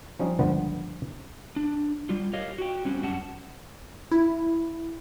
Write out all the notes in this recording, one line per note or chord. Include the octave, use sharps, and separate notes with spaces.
F3 G3 C#4 D#4
G1 C#2 D3 F3 B3 B4
D4
G3 F4
G4 A#4 C#5 D#5 F5
F#4 G5
G3 C4 C#4 F#4 G4
F#2 G3 C#4 F#5 A5
E4